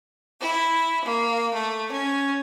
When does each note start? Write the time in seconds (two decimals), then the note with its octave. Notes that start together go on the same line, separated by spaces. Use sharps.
0.39 E4
1.04 A#3
1.52 A3
1.91 C#4